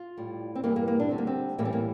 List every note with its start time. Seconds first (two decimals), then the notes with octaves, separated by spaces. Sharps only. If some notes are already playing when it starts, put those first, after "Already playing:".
Already playing: F4
0.17 A2 G3
0.55 C4
0.64 G2 E3 G3 A#3
0.76 A#3
0.88 A#3
1.00 D4
1.09 D2 D3 G3 C4
1.18 A#3
1.27 C4
1.58 A2 E3 G3 A#3
1.65 C4
1.73 A#3